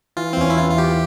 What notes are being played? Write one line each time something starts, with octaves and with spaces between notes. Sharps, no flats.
E3 F4
C4
E2 C#4
E4
E3 F4
F4
E3 G4